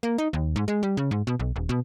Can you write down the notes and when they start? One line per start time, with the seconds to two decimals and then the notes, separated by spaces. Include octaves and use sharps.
0.03 A#3
0.18 D#4
0.33 D#2
0.56 G#2
0.68 G#3
0.83 G3
0.97 C#3
1.11 G#2
1.27 B2
1.39 B1
1.56 D#1
1.69 B2